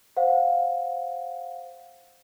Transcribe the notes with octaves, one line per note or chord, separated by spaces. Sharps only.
C5 F5 F#5